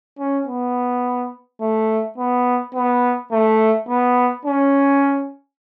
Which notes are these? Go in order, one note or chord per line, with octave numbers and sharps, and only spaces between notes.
C#4
B3
A3
B3
B3
A3
B3
C#4